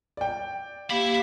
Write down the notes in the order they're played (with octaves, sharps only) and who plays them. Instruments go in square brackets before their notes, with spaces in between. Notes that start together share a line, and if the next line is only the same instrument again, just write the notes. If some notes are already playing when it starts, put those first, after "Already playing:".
[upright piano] D5 G5
[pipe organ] A#3 G4 F5 [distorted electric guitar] E5 B5